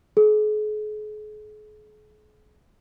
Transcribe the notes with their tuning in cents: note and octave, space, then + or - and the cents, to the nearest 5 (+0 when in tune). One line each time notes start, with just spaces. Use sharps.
G#4 +40